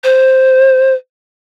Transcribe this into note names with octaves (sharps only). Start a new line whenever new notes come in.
C5